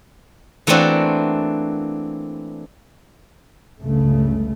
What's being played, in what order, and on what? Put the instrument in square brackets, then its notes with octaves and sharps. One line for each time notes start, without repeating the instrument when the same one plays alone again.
[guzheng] E3 A3 A#3 C4 D4 F#4
[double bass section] G1 C#2 G2 C#3 A3